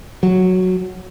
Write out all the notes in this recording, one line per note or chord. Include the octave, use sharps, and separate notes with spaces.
F#3